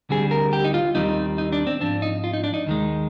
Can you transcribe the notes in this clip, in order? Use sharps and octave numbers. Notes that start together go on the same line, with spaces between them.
D2 D3 G3 C4 G#4
A#4
G4
D#4
F4
D#2 D#3 G3 C4 D#4
D#4
D4
C4
G#2 F3 C4 D4
D#4
F4
D#4
D4
D#4
D#2 D#3 G#3